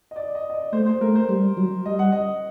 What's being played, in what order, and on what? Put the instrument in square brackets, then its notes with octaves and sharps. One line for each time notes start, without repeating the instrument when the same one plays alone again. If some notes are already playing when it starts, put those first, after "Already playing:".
[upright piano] D#5
D5
D#5
D#5
D5
[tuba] A3 [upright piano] C5
[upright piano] C5
[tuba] A3 [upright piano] A#4
[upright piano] C5
[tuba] G3
F#3
[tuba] G3 [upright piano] D#5
[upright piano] F#5
D#5